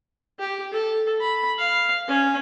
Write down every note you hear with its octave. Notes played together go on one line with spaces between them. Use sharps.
G4
A4
B5
F5
C#4